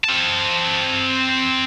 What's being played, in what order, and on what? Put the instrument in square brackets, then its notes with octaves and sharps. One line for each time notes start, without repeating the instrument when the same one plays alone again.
[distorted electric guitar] C4 A5